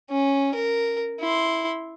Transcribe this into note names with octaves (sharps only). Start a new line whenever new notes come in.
C#4
A#4
E4 C6